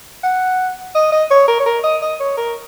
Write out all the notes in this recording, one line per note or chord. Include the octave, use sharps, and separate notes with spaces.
F#5
D#5
D#5
C#5
A#4
C#5
A#4
D#5
D#5
C#5
A#4